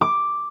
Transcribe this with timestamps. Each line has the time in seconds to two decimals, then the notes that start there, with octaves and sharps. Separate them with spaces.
0.01 D6